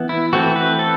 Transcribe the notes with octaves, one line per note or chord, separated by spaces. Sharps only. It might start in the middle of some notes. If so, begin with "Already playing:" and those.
Already playing: E3 B3
E4
E3 A3 C4 F#4
B4
A4